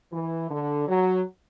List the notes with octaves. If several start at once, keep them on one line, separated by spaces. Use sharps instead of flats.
E3
D3
F#3